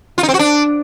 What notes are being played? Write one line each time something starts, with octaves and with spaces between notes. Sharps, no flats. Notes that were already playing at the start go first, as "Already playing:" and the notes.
F4
D#4
C4
F#4
D4